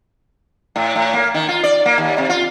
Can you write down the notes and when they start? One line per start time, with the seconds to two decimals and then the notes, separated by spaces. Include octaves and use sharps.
0.76 A2
0.96 A2
1.13 A#3
1.34 D#3
1.48 F4
1.63 D5
1.86 A#3
1.98 D#2
2.18 C3
2.29 F4